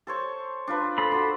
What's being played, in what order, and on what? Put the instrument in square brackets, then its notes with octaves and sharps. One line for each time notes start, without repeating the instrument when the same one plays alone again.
[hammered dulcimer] A4 C5 C#5
D4 F4 B4
[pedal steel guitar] A4 C5 B5
[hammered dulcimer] D4 F#4